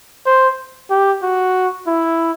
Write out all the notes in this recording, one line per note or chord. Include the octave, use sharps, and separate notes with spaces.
C5
G4
F#4
E4